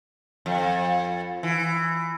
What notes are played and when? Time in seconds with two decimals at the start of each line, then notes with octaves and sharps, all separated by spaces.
0.46 F2
1.43 E3